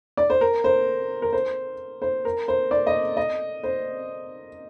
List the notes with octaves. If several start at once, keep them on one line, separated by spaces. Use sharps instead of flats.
D5
C5
A#4
C5
A#4
C5
C5
A#4
C5
D5
D#5
D#5
C5